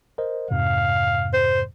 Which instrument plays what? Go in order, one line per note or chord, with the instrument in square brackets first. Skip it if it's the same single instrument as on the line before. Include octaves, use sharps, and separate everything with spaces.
[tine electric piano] A#4 C5 D#5
[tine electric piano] F2 G#2 C3 [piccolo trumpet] F5
[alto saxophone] C5